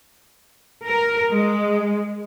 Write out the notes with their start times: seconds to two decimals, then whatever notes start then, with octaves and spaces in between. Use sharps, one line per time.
0.88 A#4
1.32 G#3